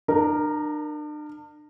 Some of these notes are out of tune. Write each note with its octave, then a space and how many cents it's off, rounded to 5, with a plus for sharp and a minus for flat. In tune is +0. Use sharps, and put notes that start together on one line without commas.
D4 +40 A#4 +0